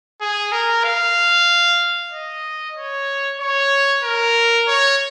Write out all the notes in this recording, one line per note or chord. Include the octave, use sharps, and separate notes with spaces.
G#4
A#4
F5
D#5
C#5
C#5
A#4
C#5